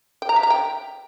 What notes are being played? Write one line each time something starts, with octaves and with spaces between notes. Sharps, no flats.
G5
A#5
E5
A#5
G5